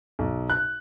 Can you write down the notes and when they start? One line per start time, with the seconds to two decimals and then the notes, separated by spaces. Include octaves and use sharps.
0.19 B1
0.50 F#6